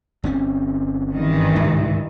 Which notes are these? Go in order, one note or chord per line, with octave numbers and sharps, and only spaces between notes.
G1 C4 C#4
G2 D#3 E3
C2 G#2 D3